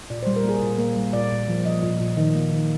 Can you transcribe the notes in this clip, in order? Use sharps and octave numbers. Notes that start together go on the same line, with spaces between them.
A#2 D5
C5
G3
A#4
A#3 G#4
A#2
A#3
G3
A#2 D5
A#2
F3
F3 D#5
A#2
A#2
D#3 D#5
A#3
D#3